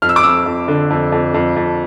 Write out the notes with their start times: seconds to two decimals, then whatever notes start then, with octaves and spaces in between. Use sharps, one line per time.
0.02 F2 F6
0.09 E6
0.16 D6
0.23 F2 E6
0.46 F2
0.68 D3
0.90 F2
1.12 F2
1.34 F2
1.56 F2